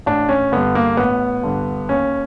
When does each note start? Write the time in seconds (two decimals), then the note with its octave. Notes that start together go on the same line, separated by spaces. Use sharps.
0.06 A1 D4
0.29 C#4
0.52 G2 D3 B3
0.75 A#3
0.97 A1 B3
1.43 G2 D3
1.89 D#2 C#4